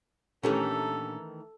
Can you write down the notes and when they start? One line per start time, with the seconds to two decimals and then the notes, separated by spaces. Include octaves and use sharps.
0.43 A#2 D#3 E3 A3 C#4 D4 G4 A4